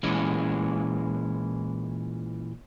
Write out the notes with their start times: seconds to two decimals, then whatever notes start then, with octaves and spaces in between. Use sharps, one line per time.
0.03 A#2 E3 G#3 C#4